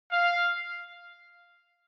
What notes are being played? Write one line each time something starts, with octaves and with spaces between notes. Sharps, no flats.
F5